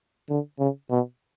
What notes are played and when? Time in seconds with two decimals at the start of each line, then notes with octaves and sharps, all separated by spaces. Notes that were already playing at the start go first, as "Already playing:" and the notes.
0.30 D3
0.59 C#3
0.91 B2